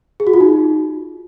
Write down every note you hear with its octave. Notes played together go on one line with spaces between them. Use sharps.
G#4
F#4
F4
D#4